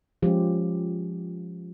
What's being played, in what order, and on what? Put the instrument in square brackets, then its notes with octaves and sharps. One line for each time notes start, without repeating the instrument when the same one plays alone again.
[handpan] F3 G#3 C#4 F4 G4